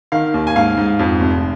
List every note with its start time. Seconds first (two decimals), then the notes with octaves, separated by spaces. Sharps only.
0.12 D#3 F5
0.34 D#2
0.47 G#5
0.56 G#2 F5
0.77 G#2
0.99 F2
1.20 F1